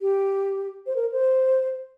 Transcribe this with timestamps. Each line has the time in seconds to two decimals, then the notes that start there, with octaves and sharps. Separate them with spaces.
0.01 G4
0.86 C5
0.96 A#4
1.12 C5